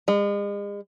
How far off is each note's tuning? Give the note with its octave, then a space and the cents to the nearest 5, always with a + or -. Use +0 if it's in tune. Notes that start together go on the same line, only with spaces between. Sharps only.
G#3 -40